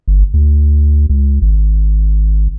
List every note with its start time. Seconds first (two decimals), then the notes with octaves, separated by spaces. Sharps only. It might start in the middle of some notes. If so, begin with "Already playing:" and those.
0.08 G1
0.34 D2
1.10 C#2
1.42 G#1